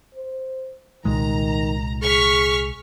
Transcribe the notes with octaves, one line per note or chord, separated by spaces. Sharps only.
C5
C2 A#2 D#3 G#3 A#5
G#4 C#6 F6 B6